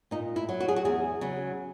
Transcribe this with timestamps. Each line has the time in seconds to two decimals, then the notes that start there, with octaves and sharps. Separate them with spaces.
0.11 A#2 D#4
0.36 E4
0.49 F#3
0.60 F#4
0.68 G#4
0.76 F#4
0.85 E2 G#4
1.21 C#3 F#3